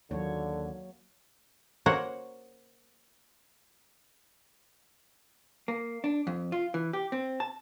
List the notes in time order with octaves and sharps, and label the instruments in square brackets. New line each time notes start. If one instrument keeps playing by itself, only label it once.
[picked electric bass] D#2 [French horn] D3 [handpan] F#3 A#3 C#5
[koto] A#3 F#4 A#4 C5 C#5 F#5
[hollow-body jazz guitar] A#3
D4
F2
F4
E3
G4
C4
A5